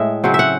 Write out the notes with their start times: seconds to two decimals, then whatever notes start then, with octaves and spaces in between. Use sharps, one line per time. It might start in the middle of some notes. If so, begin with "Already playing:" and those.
Already playing: A2 G#3 E5
0.24 C#3 F#3 C4
0.34 E5
0.39 F#5